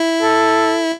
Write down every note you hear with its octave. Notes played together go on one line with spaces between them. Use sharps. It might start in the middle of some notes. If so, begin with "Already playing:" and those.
Already playing: E4
A4